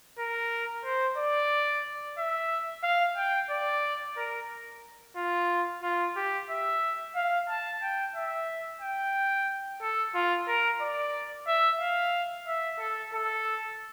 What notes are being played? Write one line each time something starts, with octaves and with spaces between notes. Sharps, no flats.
A#4
C5
D5
E5
F5
G5
D5
A#4
F4
F4
G4
E5
F5
A5
G5
E5
G5
A4
F4
A#4
D5
E5
F5
E5
A4
A4